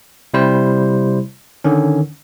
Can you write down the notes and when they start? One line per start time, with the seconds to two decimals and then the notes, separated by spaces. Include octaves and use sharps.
0.34 C3 G3 E4 C5
1.64 D3 D#3 C#4